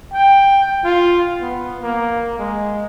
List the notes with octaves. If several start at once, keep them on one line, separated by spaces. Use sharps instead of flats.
G5
F4
B3
A#3
G#3